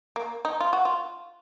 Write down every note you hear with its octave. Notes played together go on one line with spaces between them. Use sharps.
A#3
D#4
F4
F#4
F4